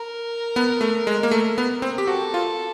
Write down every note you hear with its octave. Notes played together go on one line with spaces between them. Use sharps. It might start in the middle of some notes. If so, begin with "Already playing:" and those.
Already playing: A#4
B3
A3
G#3
A#3
A3
B3
C4
G4
F#4 A4
F4